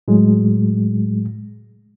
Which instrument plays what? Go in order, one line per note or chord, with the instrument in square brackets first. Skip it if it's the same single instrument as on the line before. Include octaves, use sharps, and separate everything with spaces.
[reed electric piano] A2 F#3 G#3